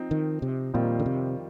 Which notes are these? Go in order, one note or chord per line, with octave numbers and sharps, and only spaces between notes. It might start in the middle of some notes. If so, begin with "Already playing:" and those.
Already playing: F3 C4 D#4
D#3
C3
F2 A#2 D#3 G3 C4 F4
D3
C3